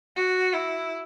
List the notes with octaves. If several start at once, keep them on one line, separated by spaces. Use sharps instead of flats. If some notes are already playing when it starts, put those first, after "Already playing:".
F#4
E4